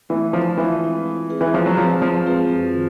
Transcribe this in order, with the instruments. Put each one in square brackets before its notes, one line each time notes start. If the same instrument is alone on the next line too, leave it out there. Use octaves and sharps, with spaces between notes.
[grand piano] E3 [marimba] A3
[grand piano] F3 [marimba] D4 F4 A4 C#5
[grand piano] E3 [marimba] G#3
[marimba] C4 F4 G#4 B4
G#3
C4 F4 G#4 B4
[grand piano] E3
[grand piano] F3 [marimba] G#3
[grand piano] F#3
[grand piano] F3 [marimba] C4 F4 G#4 B4
[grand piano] F3 [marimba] G#3
[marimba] C4 F4 G#4 B4
F#2
D#3